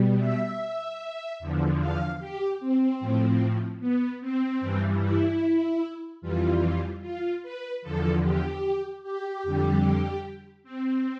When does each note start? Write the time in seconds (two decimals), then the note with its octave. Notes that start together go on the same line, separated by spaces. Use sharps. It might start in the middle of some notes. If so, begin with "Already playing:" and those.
Already playing: B2 G3
0.18 E5
1.39 E2 D3 F3
1.80 F5
2.19 G4
2.60 C4
3.00 A2 F3
3.80 B3
4.21 C4
4.61 G2 E3 G3
5.01 E4
6.21 F2 E3 G3 F4
7.02 F4
7.43 B4
7.82 E2 D3 F3 A4
8.22 G4
9.03 G4
9.43 F2 D3 G3
10.64 C4